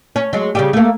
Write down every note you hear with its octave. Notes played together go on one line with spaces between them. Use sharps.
C#4
F#3 G#3
C#3 G3 G4
A3 A#3